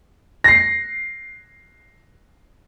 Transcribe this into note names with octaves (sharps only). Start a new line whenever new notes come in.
A#6 C7